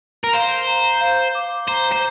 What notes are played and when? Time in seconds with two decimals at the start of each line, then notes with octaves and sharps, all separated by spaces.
0.24 A#4
0.33 C5 F5
0.67 A#5
1.01 F5
1.35 D6
1.68 C5 A#5
1.92 C5